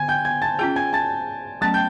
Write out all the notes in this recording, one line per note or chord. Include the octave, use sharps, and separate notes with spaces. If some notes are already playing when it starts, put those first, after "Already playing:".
Already playing: D3 G#5 G#6
G5 G6
G#5 G#6
A5 A6
C#4 F4 G#4 G5 G6
G#5 G#6
A5 A6
F#3 A3 C#4 A5 A6
G5 G6